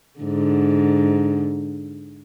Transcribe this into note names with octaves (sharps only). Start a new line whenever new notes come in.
G#2 D3